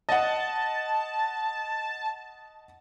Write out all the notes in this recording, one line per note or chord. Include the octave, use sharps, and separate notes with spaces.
D#5 F#5 A5